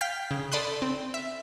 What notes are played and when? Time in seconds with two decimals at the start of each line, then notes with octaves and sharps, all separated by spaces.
0.01 F5 G5 F6 G6 B6
0.31 C#3
0.52 A4 D5 B5 C6 D#6 F#6
0.82 C4
1.14 E5